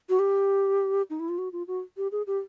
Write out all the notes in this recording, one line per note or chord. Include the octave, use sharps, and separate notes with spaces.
F#4
G4
D#4
E4
F4
F#4
F4
F#4
G4
G#4
G4